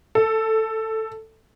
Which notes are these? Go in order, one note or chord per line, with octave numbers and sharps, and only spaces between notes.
A4